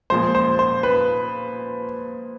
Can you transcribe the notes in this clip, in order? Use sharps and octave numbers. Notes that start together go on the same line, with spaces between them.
A#2 F3 G#3 C5
C5
C5
B4